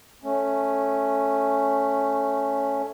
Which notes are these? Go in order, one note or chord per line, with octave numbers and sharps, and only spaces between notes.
A3 C#4